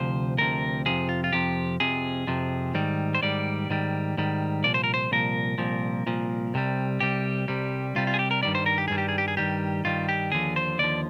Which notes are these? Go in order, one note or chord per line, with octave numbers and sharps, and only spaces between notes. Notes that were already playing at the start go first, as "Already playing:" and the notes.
Already playing: D2 C3 F3 C5
D2 C3 F3 A#4
F2 C3 F3 G#4
F4
F4
F2 C3 F3 G4
F2 C3 F3 G#4
F2 C3 F3
G#2 D#3 G3
C5
G#2 D#3 G3 D5
G#2 D#3 G3
G#2 D#3 G3
C2 A#2 F3 D5
C5
A#4
C5
C2 A#2 F3 A#4
C2 A#2 F3
C2 A#2 F3
C2 C3 G3
C2 C3 G3 G4
C2 C3 G3
C2 C3 G3 F4
F4
G#4
G4
A#4
G2 D#3 G3 D5
C5
A#4
G4
G2 D#3 G3 G#4
G4
G#4
G4
G#4
G2 D#3 G3 G4
G2 D#3 G3 F4
G4
D#2 D3 F3 G#4
C5
D#2 D3 F3 D5